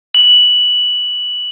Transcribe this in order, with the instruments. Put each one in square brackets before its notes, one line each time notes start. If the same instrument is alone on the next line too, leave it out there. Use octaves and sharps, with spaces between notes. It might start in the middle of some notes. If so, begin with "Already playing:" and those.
[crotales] F#7